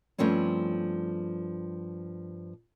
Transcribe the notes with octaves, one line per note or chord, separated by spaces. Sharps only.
G2 F3 A3 C4 C#4